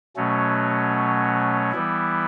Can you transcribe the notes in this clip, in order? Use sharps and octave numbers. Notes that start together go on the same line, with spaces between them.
B2 F#3 A3 C#4
E3 G3 B3 E4